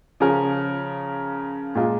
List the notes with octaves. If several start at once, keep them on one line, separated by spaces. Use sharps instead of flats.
C#3 F3 C#4 A#4
A#2 G#3 F4 A#4